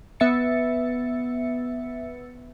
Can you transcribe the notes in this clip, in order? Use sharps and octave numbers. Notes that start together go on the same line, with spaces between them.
B3 E5 A6 C#7